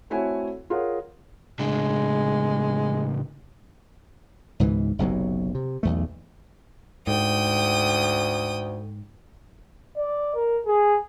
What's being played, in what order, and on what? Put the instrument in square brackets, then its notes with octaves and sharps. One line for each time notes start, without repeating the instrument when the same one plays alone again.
[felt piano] A3 C4 E4 F#4 C#5 G#5
F4 G#4 A#4 C#5 F5 F#5
[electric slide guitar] A2 C#3 D4 [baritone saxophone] G#3
[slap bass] C#2 G#2 B2 E3
F#1 B1 C3 F#3
C3
B1 E2 A3
[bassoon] D2 [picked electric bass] G#2 [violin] G5 D#6
[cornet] D5
A#4
G#4